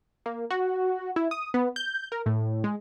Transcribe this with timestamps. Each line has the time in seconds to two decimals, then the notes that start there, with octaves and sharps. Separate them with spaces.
0.26 A#3
0.51 F#4
1.16 E4
1.31 D#6
1.54 B3
1.76 G6
2.12 A#4
2.26 A2
2.64 G#3